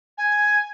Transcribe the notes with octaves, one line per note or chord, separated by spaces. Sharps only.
G#5